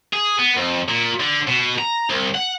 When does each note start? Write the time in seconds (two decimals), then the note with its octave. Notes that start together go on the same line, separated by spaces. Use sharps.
0.13 G#4
0.39 B3
0.57 F2
0.89 A#2
1.20 D3
1.48 B2
1.79 A#5
2.10 C2
2.35 F#5